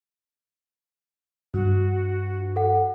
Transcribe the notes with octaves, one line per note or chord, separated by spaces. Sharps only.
G2 F#4
A4 F#5